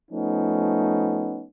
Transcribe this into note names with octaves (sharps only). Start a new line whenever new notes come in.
F3 A3 B3 C#4 D#4